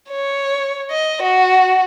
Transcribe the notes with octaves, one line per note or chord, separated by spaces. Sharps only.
C#5
D#5
F#4